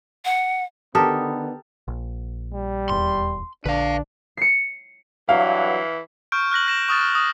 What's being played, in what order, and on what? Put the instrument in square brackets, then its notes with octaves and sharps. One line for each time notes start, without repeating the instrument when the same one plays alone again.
[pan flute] F#5
[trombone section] D3 D#3 B3 [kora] G4 A4 A#4 [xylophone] A5 D#6
[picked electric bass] A#1
[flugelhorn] G3
[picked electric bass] D#1 E2 [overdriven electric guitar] C6
[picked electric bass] A#1 D3 [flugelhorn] D4 [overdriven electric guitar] B4 F5
[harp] C7 C#7
[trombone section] G2 F#3 [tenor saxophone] E3 [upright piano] F5
[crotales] C#6 F6 G6 D7
F6 F#6 A#6 F#7
F6 A#6 E7
C#6 D#6 F6 A6
F6
D#6